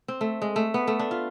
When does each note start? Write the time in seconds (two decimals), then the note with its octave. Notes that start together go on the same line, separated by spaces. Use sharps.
0.08 C4
0.21 A3
0.42 G#3
0.56 A3
0.74 B3
0.87 A3
0.99 D4
1.11 F4